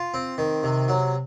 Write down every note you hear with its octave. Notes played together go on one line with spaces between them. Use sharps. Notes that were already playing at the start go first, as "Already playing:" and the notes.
Already playing: F4
C4
D#3
C3
F#3